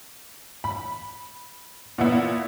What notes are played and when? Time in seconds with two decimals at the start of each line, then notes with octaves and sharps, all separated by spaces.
0.64 B5
1.98 A#2 B3 E4